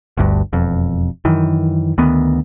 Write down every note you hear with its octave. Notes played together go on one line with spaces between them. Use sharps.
G1 D2 G2
E1 F2
F#2 D#3 E3
D2 D#3 B3